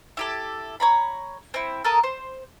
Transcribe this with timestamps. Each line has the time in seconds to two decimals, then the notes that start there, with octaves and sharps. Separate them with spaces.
0.17 E4 G4 A4
0.80 C#5 A#5 B5
1.54 C4 E4
1.85 A4 A#4 D#6
2.03 C5